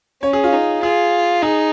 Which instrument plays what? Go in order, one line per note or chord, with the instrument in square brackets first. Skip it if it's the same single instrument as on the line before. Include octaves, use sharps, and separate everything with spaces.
[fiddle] C#4 [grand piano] C#5
[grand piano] G#4
F4
[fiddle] D#4
[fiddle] F4 [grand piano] G#4
[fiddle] D#4 [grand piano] G#4